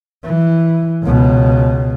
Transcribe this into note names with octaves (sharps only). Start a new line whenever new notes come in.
E3
C#2 B2